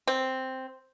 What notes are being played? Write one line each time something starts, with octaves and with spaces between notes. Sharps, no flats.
C4